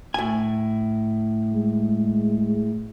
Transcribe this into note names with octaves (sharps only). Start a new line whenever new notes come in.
A2 G#5
G#3